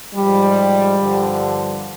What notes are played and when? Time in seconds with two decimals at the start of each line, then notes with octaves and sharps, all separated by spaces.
0.15 G#2 F3 G3
0.98 G2 D3 F3